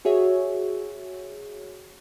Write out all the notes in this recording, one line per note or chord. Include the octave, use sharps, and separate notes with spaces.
F#4 G#4 C#5 E5